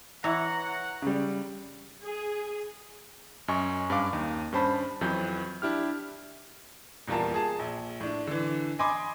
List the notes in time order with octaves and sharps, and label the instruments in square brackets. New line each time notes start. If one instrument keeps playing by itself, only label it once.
[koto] E3 [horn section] C#5 F#5 [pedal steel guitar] A#5
[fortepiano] C#3 G3
[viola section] G#4
[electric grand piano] F#2 D#5 G#5 C#6
G2 C#4 D4 F5 D6
D#2 D#4
G2 C#4 C5 A5 B5
F2 E3 F#3 B4 G6
D4 E4 G4 F6
[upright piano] D#1 E2 G3 F4 A#4 A5
G#4 A5
A#1
A2 D4
D3 E3
D#5 G#5 B5 C6 D6 D#6